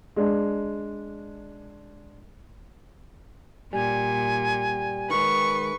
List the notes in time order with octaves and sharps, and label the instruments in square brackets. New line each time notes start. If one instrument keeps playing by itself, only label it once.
[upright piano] G#3 D4
[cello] A#2 [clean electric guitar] G3 [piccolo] G#5
[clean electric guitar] D#3 G#3 [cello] B4 [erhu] C#6